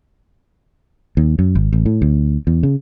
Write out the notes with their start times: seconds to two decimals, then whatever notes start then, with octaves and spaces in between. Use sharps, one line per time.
1.17 D#2
1.39 F#2
1.55 G#1
1.73 A1
1.86 A2
2.02 D2
2.47 E2
2.63 C#3